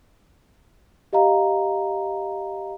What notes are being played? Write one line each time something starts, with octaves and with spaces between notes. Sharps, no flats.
G4 D#5 F5 A#5